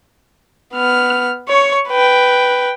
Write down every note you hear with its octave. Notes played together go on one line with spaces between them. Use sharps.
B3 F6
C#5 C#6
B4 G5